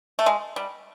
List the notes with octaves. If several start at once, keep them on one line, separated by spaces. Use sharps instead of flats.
A3
G#3
G3